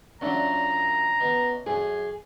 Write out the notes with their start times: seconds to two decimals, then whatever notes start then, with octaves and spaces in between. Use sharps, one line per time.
0.21 A#2 F#3 C#4 D4 E5 A#5
1.20 B2
1.66 F#2 G#4